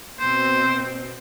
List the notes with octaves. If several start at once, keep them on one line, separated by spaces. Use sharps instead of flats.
B2 C4 C5